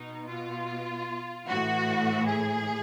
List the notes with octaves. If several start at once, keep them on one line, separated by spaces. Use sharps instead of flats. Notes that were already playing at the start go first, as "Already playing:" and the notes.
Already playing: B2 D#4
F4
A2 E3 F#4
G#4